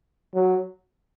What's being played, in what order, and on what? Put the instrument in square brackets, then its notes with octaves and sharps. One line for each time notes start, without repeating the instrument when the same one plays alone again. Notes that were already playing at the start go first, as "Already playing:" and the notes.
[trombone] F#3